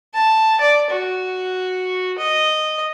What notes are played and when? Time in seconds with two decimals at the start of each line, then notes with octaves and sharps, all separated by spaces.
0.14 A5
0.61 D5
0.91 F#4
2.18 D#5